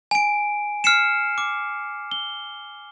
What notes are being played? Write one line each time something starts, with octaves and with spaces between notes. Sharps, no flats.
G#5 D7
F6 C7 C#7 E7
D6
G7